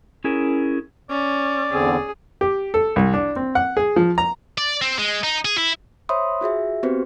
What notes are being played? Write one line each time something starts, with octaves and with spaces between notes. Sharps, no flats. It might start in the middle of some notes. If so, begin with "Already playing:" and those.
C#4 E4 G#4 A#4
C#4 D5
E2 D3 C4 G#4
G4
A4
C2
D4
C4
F#5
G#4
F3
A#5
D5
C4
G#3
D#4
G#4
E4
C5 C#5 E5 B5 C6 D#6
F4 F#4 G#4 E5
B3 C4 F#4 G4 B4 C5